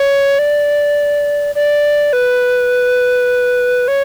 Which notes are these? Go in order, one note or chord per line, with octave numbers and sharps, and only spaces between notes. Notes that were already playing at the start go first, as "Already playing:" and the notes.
Already playing: C#5
D5
D5
B4
C#5